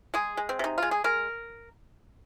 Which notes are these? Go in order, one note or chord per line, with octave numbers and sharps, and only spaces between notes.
G#3 G#4
G#3
C4
C3 D#4
G#3 F4
G#4
G#3 A#4